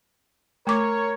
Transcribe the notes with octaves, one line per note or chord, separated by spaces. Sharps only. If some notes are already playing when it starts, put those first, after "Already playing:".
A3 A#4 C#5 D6